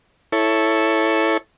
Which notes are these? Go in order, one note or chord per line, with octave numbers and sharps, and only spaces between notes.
E4 A4 C#5